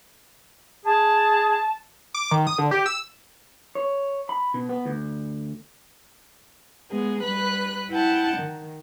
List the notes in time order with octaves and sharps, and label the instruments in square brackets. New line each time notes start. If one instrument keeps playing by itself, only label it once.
[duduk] G#4 [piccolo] A5
[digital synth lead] D6
D#3
D#6
D3
G4
E6
[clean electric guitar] C#5
B5
B2
B3
D2
[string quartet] G#3 B3 G#4
G3 B4 B5 F#6
E4 F#5 G5 A5
D#3